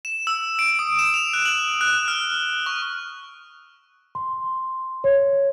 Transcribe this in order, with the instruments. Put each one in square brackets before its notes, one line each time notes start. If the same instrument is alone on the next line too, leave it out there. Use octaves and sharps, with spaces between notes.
[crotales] E7
E6
D7
D#6
E7
F7
F#6
F#7
F#6
F6
C#6
[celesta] C6
C#5